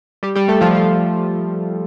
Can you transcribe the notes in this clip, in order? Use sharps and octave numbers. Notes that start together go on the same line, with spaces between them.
G3 G4
G3 G4
A3 A4
F3 F4
F3 F4